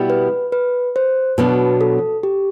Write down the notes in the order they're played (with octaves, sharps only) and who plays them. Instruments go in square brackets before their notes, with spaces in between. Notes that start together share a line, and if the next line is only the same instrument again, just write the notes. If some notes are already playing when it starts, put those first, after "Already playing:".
Already playing: [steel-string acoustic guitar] B2 G3 B3 E4
[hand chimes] B4
B4
C5
[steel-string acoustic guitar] B2 F#3 B3 D4 [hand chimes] B4
[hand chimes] A4
G4